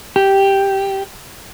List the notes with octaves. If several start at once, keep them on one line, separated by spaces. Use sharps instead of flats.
G4